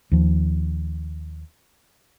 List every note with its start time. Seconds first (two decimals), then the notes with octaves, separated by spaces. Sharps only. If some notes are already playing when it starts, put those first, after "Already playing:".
0.12 D#2 F3